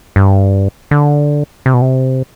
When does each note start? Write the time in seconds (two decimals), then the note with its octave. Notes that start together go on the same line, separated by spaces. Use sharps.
0.16 G2
0.91 D3
1.66 C3
1.74 B2
1.82 C3